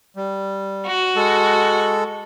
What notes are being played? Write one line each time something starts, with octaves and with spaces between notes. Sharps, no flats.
G3
F#4
G#3 A4